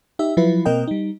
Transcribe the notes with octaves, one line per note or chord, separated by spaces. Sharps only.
D#4 G4 E5
F3 F#3 E4 F4 B4
B2 A#3 C4 A#4 D#5 G5
G3 D#4